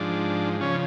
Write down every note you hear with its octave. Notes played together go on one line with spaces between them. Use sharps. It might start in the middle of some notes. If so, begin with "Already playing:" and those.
Already playing: G#2 F3 D4
C#3 F3 C#4